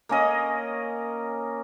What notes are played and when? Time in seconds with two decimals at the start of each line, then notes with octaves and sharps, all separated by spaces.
0.09 A#3 C#4 D#5